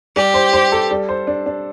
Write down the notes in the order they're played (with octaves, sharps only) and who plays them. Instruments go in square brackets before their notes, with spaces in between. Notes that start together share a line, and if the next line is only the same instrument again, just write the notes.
[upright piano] G3 [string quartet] G4
[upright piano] C5
C5
A4
G3
C5
D4
D4